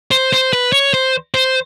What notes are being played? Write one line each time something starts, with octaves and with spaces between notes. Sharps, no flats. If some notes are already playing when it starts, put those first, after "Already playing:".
C5
C5
B4
C#5
C5
C5